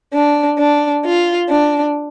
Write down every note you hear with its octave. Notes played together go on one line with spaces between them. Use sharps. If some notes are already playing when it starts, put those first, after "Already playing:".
D4
D4
F4
D4